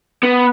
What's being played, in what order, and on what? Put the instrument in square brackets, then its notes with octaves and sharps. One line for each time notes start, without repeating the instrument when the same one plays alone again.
[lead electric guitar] B3